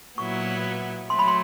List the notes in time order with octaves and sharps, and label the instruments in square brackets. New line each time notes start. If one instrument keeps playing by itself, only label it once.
[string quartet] A#2 F#3 B3 E4 [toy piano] C#6
[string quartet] F#3 A3 [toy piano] C6
[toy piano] B5
C6